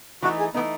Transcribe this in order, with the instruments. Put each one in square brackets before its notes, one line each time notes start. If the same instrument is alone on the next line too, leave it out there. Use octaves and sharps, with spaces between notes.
[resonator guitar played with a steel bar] E3 A3 D#4 [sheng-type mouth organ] F#4
[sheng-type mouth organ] G#4
[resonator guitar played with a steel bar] E3 A3 D#4 [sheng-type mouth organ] B3